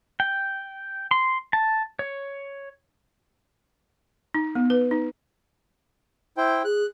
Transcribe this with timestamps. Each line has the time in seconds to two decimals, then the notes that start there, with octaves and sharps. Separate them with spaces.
0.20 G5
1.11 C6
1.53 A5
1.99 C#5
4.34 D#4
4.55 B3
4.70 B4
4.91 D#4
6.37 E4 C5 G5
6.65 G#4 F#6